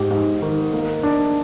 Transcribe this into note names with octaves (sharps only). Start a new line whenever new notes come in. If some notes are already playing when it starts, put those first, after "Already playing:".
Already playing: G#2 G4
G#2
D#3
A#3
D4